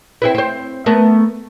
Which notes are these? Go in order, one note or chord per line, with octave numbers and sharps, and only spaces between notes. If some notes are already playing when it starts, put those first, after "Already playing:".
C4 E4 B4
C4 C5
A3 B3 A#4